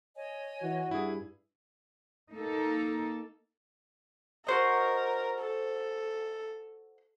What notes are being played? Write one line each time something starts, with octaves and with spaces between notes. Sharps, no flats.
C#5 D#5 G#5
E3 F#4
G2 E4 G#4
A#3 D#4 A4
F#4 A#4 C5 D#5
A4